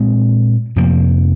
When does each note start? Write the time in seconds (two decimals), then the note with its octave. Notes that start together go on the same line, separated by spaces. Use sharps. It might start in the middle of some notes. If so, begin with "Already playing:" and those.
Already playing: A#2 G#3 C4
0.76 F2 C3 F3 A#3